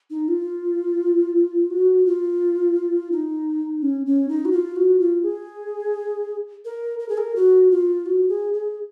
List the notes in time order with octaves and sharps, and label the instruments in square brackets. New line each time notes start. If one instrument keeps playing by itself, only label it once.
[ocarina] D#4
F4
F#4
F4
D#4
C#4
C#4
D#4
F#4
F4
F#4
F4
G#4
A#4
A#4
G#4
A#4
F#4
F4
F#4
G#4
G#4